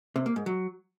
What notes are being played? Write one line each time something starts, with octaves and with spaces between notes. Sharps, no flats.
C3
A#3
G#2
F#3